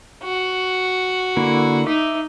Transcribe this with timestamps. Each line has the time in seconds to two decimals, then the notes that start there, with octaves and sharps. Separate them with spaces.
0.23 F#4
1.37 D3 A#3 E4
1.87 D#4 E5 D6